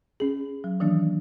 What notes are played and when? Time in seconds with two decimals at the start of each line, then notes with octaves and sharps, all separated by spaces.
0.20 C#4 G#4
0.64 F#3
0.80 D#3 E3 F#3 A#3 D4